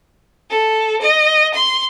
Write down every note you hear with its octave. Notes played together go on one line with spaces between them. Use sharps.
A4
D#5
C6